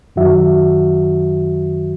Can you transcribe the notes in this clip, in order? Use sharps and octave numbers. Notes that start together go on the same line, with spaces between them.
F#2 D#3 F#3 F#4 E5